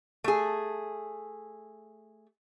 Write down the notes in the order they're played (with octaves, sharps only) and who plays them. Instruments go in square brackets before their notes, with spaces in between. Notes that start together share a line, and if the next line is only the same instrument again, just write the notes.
[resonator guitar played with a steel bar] A3 G#4